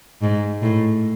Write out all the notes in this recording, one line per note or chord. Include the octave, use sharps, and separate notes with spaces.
G#2
A2